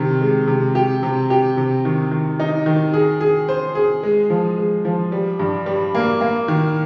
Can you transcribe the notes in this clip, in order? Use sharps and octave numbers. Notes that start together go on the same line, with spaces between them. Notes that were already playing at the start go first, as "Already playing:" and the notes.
Already playing: C3 D#3
G#3
C3
G4
C3
G4
C3
D#3
D#3
D#4
D#3
G#4
G#4
C5
G#4
G#3
F3
G#3
F3
G3
G2
G3
A#3
A#3
D#3